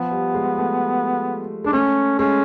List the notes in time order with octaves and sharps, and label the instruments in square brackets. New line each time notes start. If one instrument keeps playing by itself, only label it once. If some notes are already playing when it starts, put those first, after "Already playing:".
Already playing: [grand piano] F3 [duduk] B3
[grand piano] G3
G#3
A3
[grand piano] G#3 [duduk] D4
[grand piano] A3 [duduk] C#4
[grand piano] G#3 [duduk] C#4